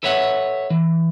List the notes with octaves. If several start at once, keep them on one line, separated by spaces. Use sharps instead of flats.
A4 B4 C#5 E5 F#5
E3